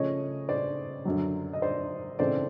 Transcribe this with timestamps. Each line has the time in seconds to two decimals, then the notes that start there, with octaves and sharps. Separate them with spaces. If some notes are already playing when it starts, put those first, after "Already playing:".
Already playing: C#3 F3 A3 C#5 D#5
0.49 C5 D5
1.05 F#2 D3 F#3
1.53 D#5
1.62 C5 D5
2.19 C#3 E3 A3 C4 C5 D5